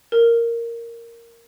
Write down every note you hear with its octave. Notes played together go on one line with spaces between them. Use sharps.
A#4